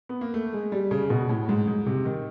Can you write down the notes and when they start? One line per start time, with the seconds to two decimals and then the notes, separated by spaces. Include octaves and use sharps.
0.09 B3
0.21 A#3
0.34 A3
0.53 G#3
0.72 G3
0.91 C#3
1.10 B2
1.29 A2
1.49 G#2
1.67 G#2
1.86 C3
2.05 D#3